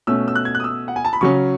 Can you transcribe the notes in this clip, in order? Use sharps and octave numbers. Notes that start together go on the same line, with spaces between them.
B2 A3 C#4 E6
E6
F#6
G#6
F#6
D#6
E6
F#5
G#5
A5
B5
C#3 F#3 C#4 C#6